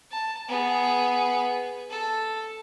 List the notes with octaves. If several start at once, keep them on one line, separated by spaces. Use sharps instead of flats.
A5
B3 G#4
A4